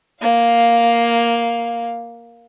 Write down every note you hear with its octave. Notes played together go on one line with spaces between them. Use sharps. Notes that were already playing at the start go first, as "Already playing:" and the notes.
A#3 F5